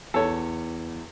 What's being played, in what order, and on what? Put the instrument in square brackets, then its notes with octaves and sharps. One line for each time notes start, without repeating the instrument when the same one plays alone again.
[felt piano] E2 [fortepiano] A4 C#5